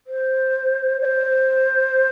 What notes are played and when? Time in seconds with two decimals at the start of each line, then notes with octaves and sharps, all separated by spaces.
0.07 C5
1.01 D5
1.05 C5